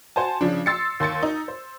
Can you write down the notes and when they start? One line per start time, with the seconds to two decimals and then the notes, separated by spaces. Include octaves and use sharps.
0.16 F#4 C5 G#5 A5
0.41 C#3 F3 D4
0.66 C6 E6 A6 C7 C#7
1.00 D#2 C6 A6 C#7
1.23 D#4
1.48 C5